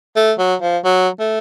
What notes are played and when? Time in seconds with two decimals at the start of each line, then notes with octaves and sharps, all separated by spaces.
0.16 A3
0.38 F#3
0.61 F3
0.84 F#3
1.19 A3